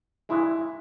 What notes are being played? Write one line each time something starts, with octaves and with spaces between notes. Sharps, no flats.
G2 E3 G#3 E4